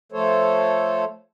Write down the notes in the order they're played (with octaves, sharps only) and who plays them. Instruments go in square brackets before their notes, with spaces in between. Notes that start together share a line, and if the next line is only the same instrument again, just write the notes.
[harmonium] F3 A3 A4 C5 C#5